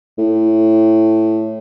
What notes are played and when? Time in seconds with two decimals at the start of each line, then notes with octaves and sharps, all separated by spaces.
0.18 A2